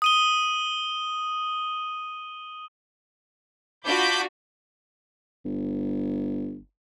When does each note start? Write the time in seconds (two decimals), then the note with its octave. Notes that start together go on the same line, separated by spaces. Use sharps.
0.02 D#6 D#7 G7
3.84 D4 F4 F#4 B5 D6 G6
5.45 G1